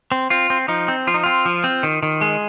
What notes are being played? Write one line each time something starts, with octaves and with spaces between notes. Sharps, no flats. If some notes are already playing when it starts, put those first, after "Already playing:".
C4
C4 F4
C4
F3 D#4
C4
F3 F4
D#4
C4 F4
F3
C4
D#3
D#3
G#3